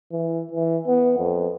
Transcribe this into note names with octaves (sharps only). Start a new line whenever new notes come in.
E3
E3
B3
F2